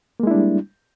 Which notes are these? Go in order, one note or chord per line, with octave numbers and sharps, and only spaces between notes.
G3 G#3 A#3 D4 E4